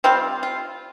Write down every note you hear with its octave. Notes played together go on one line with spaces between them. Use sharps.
G3 C4 F4
F4